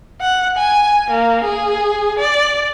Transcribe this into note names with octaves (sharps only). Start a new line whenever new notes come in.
F#5
G#5
A#3
G#4
D5